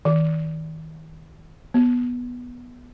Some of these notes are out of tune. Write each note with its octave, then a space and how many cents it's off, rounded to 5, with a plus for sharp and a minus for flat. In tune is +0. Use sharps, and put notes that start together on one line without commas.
D#3 +35
B3 -10